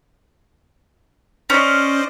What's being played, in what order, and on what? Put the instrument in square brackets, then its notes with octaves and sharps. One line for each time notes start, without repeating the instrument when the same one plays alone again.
[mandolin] C#4 [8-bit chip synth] C5 D5 D#5